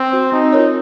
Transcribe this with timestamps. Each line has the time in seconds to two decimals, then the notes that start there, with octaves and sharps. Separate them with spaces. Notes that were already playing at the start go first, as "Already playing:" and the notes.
Already playing: C4
0.12 F#4 C5
0.32 C4 D#4
0.52 F4 A#4 C#5